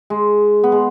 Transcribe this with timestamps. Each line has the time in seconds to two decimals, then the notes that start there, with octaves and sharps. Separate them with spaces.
0.10 G#3
0.64 B3
0.72 G#3